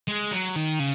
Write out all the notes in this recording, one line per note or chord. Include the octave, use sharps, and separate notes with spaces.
G#3
F#3
D#3
C#3